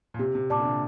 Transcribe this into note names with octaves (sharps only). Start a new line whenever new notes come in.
A#2
C3 G4
C3
A#2 D5 A5 D6
D3
C3